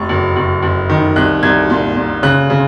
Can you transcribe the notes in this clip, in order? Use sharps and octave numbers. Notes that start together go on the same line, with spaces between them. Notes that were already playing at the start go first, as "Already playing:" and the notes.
Already playing: F1 C#6
F#1
F#1
F#1
D#3
C2 F#6
C2 G#6
A#2
A#2
C#3 F#6
C#3